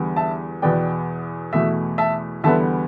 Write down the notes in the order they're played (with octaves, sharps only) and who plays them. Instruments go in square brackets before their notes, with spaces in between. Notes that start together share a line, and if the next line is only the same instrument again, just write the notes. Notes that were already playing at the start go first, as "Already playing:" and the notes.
Already playing: [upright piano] E2 D3 G3 B3
E5 A5
E2 B2 B3 D5 G5
E2 B2 A3 E5
E5 A5
E2 D3 G3 B3 E5 A5